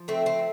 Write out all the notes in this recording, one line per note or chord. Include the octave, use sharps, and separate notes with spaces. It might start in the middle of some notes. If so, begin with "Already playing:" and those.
Already playing: F3
A3 C4
C4